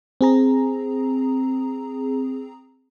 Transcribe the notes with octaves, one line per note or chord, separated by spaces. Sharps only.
C4 G#4 A#5